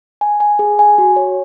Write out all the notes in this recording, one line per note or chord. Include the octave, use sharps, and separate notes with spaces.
G#5
G#5
G#4
G#5
F#4
C#5